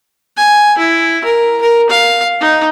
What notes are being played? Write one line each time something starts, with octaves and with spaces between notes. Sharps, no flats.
G#5
E4
A#4
A#4
F5
D#4